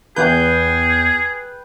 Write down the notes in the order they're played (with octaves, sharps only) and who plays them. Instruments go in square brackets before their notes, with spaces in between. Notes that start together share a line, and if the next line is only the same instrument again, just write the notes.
[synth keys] E2 G6 [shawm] G#4 [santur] B4 G5